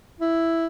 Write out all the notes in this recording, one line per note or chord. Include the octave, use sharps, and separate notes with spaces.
E4